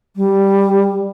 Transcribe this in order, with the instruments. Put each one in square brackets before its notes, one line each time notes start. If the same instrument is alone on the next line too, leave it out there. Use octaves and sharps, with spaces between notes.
[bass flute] G3